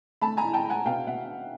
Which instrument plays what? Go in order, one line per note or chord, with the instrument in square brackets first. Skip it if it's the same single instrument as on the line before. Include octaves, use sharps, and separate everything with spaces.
[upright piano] A3 A5 B5
G#5 A#5
A2
G5 A5
A2
F#5 G#5
B2 F5 G5
B2 E5 F#5